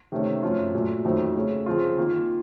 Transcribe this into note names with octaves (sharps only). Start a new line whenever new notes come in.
C3 D#3 A3 C#4
F#2 F3 A3 C#4 F4
A#2 F#3 A3
F2 D#3 F#3 A3 C4
C#3 A3 C#4
C#3 F3 C4 F4
D#3 A#3 F4